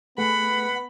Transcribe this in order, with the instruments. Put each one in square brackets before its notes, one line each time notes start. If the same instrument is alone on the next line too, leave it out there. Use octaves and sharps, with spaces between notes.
[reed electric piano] A3 G#4 B4 [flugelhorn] B3 [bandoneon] F#5 [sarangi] B5